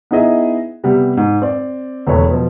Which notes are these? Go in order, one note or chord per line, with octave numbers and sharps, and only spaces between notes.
B3 D#4 E4 G#4 D#5 E5
C3 G3 B3
G#2
C4 D5
E1 E2 A3 B4 C#5
B2 F3